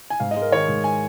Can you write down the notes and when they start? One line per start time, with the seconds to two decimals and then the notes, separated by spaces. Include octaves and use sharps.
0.10 G#5
0.20 G#2 F5
0.31 D#5
0.36 G#3
0.41 A#4
0.52 D#3 C#5
0.68 G#2
0.84 G#5